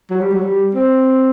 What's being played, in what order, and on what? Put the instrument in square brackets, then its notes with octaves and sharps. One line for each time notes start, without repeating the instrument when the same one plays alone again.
[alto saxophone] F#3
G3
F#3
G3
C4